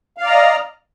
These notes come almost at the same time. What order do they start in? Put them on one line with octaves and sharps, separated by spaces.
F5 D5 A#5 D#5